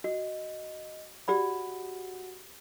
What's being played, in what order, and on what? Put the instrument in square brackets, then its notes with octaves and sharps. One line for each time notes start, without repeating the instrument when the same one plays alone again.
[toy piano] F#4 [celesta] D#5
[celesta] F#4 F#5 [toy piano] G4 D5 B5